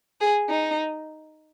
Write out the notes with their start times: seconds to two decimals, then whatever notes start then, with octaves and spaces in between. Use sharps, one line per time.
0.21 G#4
0.49 D#4